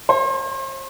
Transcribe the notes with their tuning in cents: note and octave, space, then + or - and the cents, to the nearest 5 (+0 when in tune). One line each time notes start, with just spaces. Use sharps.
C5 +40